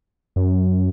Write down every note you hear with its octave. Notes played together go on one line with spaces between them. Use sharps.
F#2